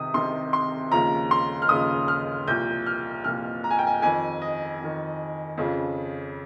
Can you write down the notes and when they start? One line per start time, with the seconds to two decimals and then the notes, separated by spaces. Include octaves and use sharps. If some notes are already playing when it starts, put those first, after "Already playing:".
Already playing: C2 C3 D#3 D#6
0.14 C2 C3 D#3 C6
0.53 C6
0.91 D#2 C#3 F3 A#5
1.31 C6
1.62 F6
1.69 D#2 C#3 F3 D#6
2.08 F6
2.47 C2 A#2 F3 G6
2.86 F6
3.24 C2 A#2 F3 F6
3.64 A#5
3.70 G#5
3.78 G5
3.87 G#5
4.02 F2 D#3 G#5
4.42 D#5
4.79 F2 D#3
5.58 F2 C#3 F3